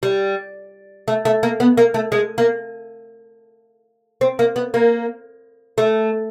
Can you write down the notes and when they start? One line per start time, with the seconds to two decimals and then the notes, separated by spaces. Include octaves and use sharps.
0.03 G3
1.08 A3
1.25 A3
1.43 A#3
1.60 B3
1.77 A#3
1.94 A3
2.12 G#3
2.38 A#3
4.21 C4
4.39 A#3
4.56 B3
4.74 A#3
5.78 A3